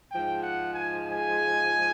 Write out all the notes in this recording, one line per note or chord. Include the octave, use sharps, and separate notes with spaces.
G#2 F3 G#3 G5
F#5
G#5
G#5